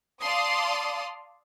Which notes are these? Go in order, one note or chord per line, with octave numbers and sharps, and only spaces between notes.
D5 F5 A5 C6 D#6